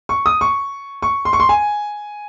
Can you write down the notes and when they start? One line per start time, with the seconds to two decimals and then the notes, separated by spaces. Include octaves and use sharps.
0.09 C#6
0.26 D#6
0.41 C#6
1.03 C#6
1.25 C6
1.33 C#6
1.40 C6
1.49 G#5